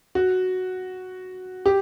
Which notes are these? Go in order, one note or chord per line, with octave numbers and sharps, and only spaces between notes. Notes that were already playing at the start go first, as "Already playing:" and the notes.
F#4
G4